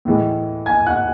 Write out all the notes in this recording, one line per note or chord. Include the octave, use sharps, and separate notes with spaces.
A2 E3 G#3
G#5 G#6
F#5 F#6